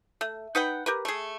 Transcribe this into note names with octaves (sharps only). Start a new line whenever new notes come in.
A3
D#4 B4 F#5 G5
G4 A#4 B4
A3 G#4